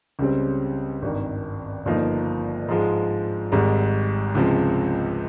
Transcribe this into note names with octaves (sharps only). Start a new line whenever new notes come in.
C#2 C#3 G3 C4
G#1 G2 D#3
G1 G2 F3 A#3 D#4
G#2 F3 G#3
G#1 G#2 G3
C#2 C3 F3 G#3